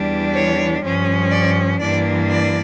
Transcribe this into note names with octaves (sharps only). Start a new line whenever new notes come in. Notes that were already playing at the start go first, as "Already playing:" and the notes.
Already playing: E2 E3 G3 D4
C#5
G2 F3 C#4
D5
G2 E3 A#3 D4 D5
D5